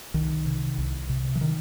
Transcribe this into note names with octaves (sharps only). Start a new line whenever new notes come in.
C2 D#3
C3
C2
C3
E3
D#3